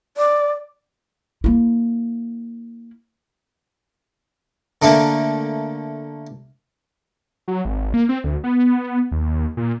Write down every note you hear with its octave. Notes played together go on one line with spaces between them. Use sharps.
D5
A#3 E4
D3 A3 A#3
F#3
G#1
A#3
C4
D2
B3
D#2
A#2